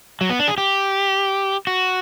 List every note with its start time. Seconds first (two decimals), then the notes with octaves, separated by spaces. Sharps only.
0.21 F#3
0.30 B3
0.39 D4
0.48 G#4
0.58 G4
1.67 F#4